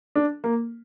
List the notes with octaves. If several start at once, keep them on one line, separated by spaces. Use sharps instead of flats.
D4
A#3